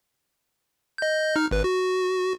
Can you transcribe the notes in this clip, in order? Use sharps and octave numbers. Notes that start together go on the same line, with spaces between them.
D#5 G6
D#4 F6
G#1 B4
F#4